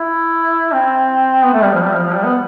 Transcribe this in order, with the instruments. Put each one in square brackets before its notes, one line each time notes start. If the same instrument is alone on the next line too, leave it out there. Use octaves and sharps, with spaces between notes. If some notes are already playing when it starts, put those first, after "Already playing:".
Already playing: [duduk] E4
C4
B3
A3
G3
F3
G3
F3
F3
G3
B3